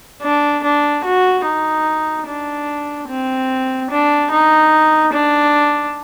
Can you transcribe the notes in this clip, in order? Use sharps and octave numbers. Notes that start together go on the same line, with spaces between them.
D4
D4
F#4
D#4
D4
C4
D4
D#4
D4